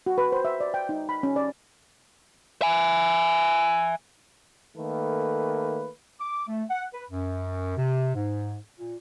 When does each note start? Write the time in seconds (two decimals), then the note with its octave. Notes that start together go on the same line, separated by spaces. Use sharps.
0.06 F#4
0.18 B4
0.32 C5
0.45 E5
0.60 D5
0.74 G5
0.89 D#4
1.09 B5
1.23 C#4
1.36 D5
2.62 E5 G#5
4.77 D#3 A3 A#3 A4 B4
6.19 D6
6.48 A3
6.69 F#5
6.93 B4
7.10 F#2
7.76 C3
8.14 G#2
8.77 A#2